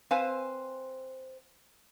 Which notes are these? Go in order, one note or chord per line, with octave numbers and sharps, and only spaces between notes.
C4 B4 C5 F5 G#5